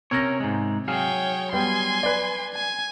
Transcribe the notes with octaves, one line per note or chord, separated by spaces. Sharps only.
C3 C#4 A#4 C#5 A#6
G#2 G#3
F#3 G#4 C#5 F5 G5
G3 B3 G5 G#5 C6
B4 D5
G#5